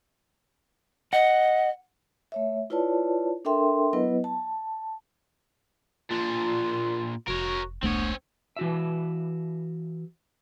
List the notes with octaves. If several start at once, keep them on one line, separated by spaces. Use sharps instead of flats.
D#5 F#5
A3 C#5 E5
E4 F4 B4 C#5 D5 A5
D4 A4 A#4 E5 G5 C6
F#3 B3 E4 B4 D#5
A5
A#2 D4 F4
F1 F#4 A#4 C#5
E1 C2 A3 B3 C4 D4 C#5
E3 F#4 E5